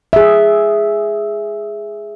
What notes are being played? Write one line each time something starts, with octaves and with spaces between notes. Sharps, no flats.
G#4 E5